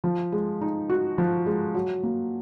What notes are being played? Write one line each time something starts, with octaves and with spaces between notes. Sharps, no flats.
F3
G#3
D#4
F#4
F3
G#3
F#3
A#3